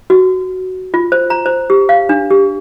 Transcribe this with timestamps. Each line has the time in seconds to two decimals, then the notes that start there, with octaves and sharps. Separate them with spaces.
0.10 F#4
0.94 F4
1.12 C5
1.30 A#5
1.46 C5
1.70 G4
1.89 F5
2.09 D4
2.30 G4